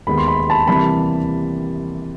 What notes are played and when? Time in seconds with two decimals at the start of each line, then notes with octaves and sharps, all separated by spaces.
0.07 D#2 D#3 G#3 B3 B5
0.18 C6
0.28 B5
0.40 C6
0.50 A5 B5
0.67 C3 E3 G3 A#3 A5 B5